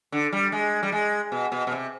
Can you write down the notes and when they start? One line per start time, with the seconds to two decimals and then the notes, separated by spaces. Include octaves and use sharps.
0.12 D3
0.33 G3
0.52 G#3
0.83 G3
0.92 G#3
1.32 B2
1.52 B2
1.67 B2
1.72 C3